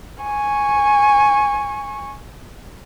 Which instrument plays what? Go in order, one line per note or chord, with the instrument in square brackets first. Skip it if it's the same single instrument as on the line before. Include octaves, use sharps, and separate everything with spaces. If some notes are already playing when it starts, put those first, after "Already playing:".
[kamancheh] G#5 C#6